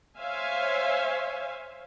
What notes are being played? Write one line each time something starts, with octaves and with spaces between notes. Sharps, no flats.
C5 C#5 E5 F5 G#5